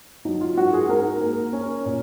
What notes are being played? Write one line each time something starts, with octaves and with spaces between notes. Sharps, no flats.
F#3 D#4
F4
G#2 F#4
G#4
G#2 A#4
A#3
C#4
A#2